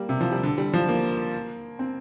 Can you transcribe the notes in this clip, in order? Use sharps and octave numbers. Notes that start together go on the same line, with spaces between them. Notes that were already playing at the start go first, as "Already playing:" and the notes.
Already playing: G3 A#3
C3
F3
G3
D3
G3
F3
A#3
C4